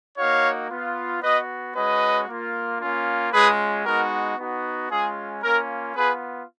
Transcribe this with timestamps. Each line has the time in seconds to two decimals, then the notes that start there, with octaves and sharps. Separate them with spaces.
0.17 A#3 D#4 F#4 C#5 F5
0.70 B3 F4
1.22 B3 F#4 B4 D#5
1.75 G#3 C#4 F#4 B4 D#5
2.27 A#3 F4
2.80 A#3 C#4 F4
3.32 G#3 C#4 F4 G#4 B4
3.85 G#3 B3 D#4 F#4 A#4
4.37 B3 D#4 F#4
4.90 G#3 C#4 F4 G#4
5.42 A#3 C#4 F4 A#4
5.95 B3 F4 G#4 B4